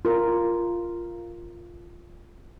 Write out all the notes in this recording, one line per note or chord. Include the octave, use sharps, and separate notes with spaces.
F4 A#4